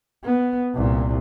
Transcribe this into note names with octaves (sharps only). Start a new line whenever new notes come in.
B3
C2 A#2